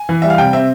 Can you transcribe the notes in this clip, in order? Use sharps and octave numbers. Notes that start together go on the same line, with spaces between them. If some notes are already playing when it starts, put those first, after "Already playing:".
Already playing: G#5
E3
G3 E5
F5
C3 G5
C4 E5